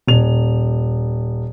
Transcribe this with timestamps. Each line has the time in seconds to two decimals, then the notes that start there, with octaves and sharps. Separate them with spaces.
0.07 D#1 F7